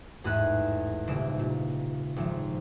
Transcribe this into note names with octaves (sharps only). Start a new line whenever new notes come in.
A1 E2 G#2 B4 F#6
D#1 C2 C#3 D7 E7
A#2
G#1 F3